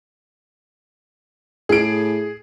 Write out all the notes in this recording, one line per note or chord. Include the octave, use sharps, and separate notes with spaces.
A2 G#4 D7